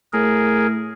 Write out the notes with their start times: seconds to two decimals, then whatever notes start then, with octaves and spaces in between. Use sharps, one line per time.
0.13 A2 G#4 A#4